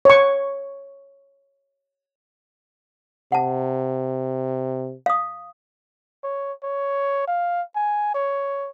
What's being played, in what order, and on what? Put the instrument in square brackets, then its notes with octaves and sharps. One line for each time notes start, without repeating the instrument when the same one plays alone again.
[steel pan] C#5 C#6
[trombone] C3 [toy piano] F#5 A5
[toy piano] F5 D#6
[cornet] C#5
C#5
F5
G#5
C#5